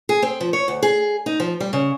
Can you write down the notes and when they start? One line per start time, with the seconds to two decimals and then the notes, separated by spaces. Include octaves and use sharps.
0.09 G#4
0.22 C4
0.40 F3
0.53 C#5
0.68 D2
0.83 G#4
1.26 D#4
1.40 F3
1.60 G3
1.73 C#3